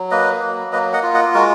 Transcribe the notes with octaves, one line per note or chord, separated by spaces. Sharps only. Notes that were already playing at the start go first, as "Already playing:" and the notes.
Already playing: F#3
A#3 B4 D#5
F#3
A#3 B4 D#5
D#5 F#5
F4
D#5 F#5
G#3 F#4 A#4